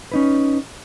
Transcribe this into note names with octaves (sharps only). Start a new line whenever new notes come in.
C#4 D#4 B4